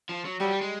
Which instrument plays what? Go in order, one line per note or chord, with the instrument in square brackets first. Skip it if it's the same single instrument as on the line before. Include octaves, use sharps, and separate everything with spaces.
[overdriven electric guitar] F3
F#3
[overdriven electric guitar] F#3 [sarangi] G3
[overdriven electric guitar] G3
G#3